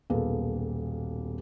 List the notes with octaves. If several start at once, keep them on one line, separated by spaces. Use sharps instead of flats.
D#1 B1 A#3 G#4 A4 B4